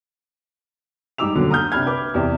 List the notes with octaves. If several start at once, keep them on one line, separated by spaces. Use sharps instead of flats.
G#2 G3 D#4 D6 E6 F7
D#2 B2 D3 F#3
A#5 D#6 F6 G6
C3 D4 B5 F6 G#6
B4 D6
E2 C3 G4 D5